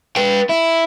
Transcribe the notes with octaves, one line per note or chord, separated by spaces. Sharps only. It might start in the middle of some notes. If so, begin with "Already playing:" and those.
B4 G5
E4